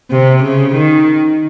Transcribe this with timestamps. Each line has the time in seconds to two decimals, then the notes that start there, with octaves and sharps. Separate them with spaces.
0.11 C3
0.43 C#3
0.74 D#3